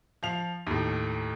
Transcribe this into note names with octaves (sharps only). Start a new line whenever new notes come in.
F3 F5 F7
D#2 A2